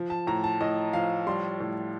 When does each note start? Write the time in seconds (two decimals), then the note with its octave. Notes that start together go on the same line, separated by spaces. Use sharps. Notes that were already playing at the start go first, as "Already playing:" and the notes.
Already playing: F3
0.10 A5
0.27 A2 A#5
0.44 A5
0.60 A2 D#5
0.93 F3 F5
1.27 G3 C6
1.60 A2